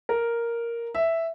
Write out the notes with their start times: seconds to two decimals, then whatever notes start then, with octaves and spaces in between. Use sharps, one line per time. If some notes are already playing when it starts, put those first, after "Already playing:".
0.09 A#4
0.95 E5